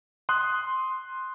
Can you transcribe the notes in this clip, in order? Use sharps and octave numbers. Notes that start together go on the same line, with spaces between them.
C6 D#6 F#6